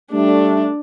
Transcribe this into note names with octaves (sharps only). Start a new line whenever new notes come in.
G3 A3 D4